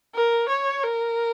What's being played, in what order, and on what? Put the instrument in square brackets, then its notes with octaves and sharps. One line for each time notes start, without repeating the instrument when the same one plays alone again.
[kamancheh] A#4
C#5
A#4